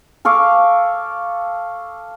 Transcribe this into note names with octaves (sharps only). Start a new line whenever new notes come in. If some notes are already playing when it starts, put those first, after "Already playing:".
A4 F5 C#6 D6